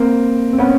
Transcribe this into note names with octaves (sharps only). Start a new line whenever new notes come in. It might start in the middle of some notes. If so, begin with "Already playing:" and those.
Already playing: A#3 C4
C4
B3 C#4